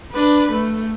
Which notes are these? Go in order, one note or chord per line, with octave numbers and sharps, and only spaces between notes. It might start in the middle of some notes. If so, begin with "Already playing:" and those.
D4 B4
A3